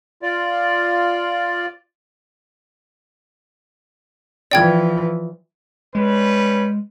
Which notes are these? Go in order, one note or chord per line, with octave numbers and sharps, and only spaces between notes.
F4 D5
E3 F3 D5 G5 G#6
G3 G#3 C#4 B4